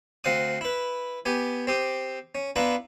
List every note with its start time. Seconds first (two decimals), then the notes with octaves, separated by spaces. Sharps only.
0.24 D2 C4 F5 F#5 D#6
0.61 E4 B4
1.25 B3 G4 G#5
1.67 C4 G4 D#6
2.35 C#4
2.56 B3 D4 E4 F4 B4 A#5